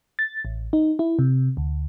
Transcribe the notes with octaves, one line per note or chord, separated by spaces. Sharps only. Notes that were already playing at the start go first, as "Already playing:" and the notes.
A6
A1
D#4
E4
C3
D2